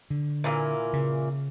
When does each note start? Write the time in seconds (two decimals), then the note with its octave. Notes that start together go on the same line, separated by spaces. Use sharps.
0.10 D3
0.44 A#2 E3 A#3
0.93 C#3